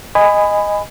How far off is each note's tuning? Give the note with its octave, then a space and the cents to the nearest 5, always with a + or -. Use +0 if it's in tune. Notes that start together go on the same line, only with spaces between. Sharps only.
D#5 +0 G#5 -10 B5 +20